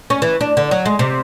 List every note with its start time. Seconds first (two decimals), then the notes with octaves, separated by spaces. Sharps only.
0.10 C#4
0.22 E3
0.41 D4
0.57 D3
0.71 F#3
0.86 G#3
0.99 C3